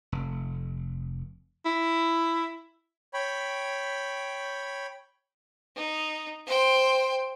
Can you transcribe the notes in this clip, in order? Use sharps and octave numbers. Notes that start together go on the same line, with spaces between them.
F1
E4
C#5 G5 B5
D#4
C5 G5